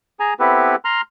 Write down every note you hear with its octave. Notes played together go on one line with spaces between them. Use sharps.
G#4 G#5 A#5
B3 C4 E4 G4 A4 B4
A#5 C6 F6